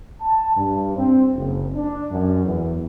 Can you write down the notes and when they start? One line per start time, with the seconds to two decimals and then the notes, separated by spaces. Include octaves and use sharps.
0.21 A5
0.56 G2
0.96 C4
1.35 F#1
1.75 D4
2.11 F#2
2.45 E2